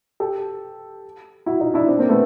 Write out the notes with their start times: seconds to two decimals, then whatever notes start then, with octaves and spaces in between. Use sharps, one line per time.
0.20 G4 A4
1.46 E4 F#4
1.60 D#4 F4
1.74 D4 E4
1.88 C4 D4
1.99 A#3 C4
2.09 A3 B3